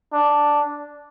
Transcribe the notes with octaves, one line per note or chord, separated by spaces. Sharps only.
D4